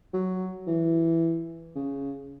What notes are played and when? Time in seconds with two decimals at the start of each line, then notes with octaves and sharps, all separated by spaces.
0.14 F#3
0.67 E3
1.75 C#3